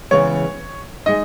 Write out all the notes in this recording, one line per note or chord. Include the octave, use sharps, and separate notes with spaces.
C#3 E3 G#3 B3 C#5
G#3 D#4 D#5